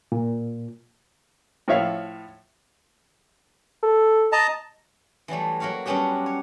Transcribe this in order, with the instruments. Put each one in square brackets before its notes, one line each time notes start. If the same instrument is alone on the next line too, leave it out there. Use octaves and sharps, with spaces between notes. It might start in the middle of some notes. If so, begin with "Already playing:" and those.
[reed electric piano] A#2
[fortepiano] A2 F3 C#5 E5 F5
[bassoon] A4
[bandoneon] D#5 A5 A#5
[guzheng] E3 F#3 G3 A3
F#3 A#3 F#4 C#5 F5
F#3 G3 B3 C#4 D4 G4
C#5